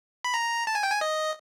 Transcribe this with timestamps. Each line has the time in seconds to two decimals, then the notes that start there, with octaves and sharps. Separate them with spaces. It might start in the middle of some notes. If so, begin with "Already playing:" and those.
0.24 B5
0.34 A#5
0.67 A5
0.75 G#5
0.83 G5
0.90 G#5
1.01 D#5